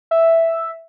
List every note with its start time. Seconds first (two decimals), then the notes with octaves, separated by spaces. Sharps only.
0.11 E5